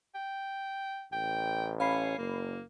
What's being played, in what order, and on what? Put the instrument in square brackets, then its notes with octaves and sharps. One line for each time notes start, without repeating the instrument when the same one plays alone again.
[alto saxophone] G5
[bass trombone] A1 [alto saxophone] G5
[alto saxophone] C#4 [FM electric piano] F5 B5 C7
[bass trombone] F#1 [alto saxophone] A#3